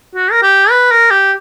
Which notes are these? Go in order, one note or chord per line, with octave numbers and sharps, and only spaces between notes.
F#4
A#4
G4
B4
A#4
G4